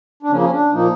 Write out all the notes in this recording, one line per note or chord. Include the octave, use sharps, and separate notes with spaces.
D4
C#3 F3 A#3 C#4
C#4
D4
A#2 F3 A#3 D#4